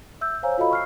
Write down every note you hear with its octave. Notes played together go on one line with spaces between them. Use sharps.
E5 E6 G6
C5 C#5 F5 G#5 A#5
F4 F#4 A4 D#5 F5 B5
C#6 F6 C7